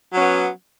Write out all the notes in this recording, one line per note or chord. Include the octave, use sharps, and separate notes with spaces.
F#3 B3 C#4